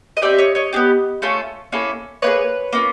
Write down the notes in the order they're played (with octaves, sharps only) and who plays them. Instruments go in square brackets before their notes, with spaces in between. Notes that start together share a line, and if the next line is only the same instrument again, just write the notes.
[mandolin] D#5
C4 D#4 G4 D5 E5
C#5 D#5
C#5 D#5
B3 D4 G4
A3 C#4 F4 A4
A#3 C#4 E4 A4
A#3 D#4 G#4 B4 C#5
A#3 C#4 F4